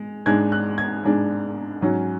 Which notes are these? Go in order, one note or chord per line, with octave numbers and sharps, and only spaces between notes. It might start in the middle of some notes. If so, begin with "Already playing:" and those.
Already playing: G#3
G#2 G#3 D4 G#6
F#6
G#6
G#2 G#3 D4
G#2 F#3 C#4